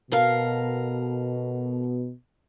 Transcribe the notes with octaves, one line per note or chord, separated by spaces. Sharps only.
B2 A4 A#4 F5